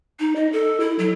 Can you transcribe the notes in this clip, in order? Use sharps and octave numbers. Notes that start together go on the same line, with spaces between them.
D#4
D#5
A4
E4
F#3